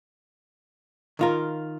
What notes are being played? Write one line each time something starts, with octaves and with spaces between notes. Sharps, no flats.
D#3 F4 A#4